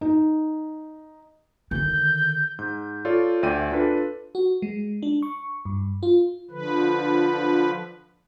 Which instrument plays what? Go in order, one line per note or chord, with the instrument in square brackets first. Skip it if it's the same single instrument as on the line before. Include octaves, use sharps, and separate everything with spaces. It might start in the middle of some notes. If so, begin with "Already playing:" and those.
[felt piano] D#4
[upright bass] D3 D#3 [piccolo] G6
[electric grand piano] G#2 G6
F4 A4 C#5 D5
D2 D5 E5 G5 C6 D#7
D4 F4 A4 B4
[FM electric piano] F#4
G#3
D4
C#6
G2
F4
[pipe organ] D3 F3 B4